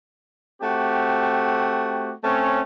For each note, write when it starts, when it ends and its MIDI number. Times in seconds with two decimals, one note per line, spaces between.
0.62 2.13 57
0.62 2.13 60
0.62 2.13 66
0.62 2.13 67
2.24 2.62 57
2.24 2.62 60
2.24 2.62 61